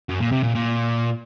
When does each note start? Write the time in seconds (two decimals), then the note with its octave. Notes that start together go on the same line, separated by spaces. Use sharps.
0.09 F#2
0.20 A#2
0.32 C3
0.43 A#2
0.55 A#2